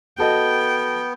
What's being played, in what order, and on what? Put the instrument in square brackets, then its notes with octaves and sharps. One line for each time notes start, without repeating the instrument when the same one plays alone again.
[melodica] B3 [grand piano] F#4 A4 D#5 [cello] G5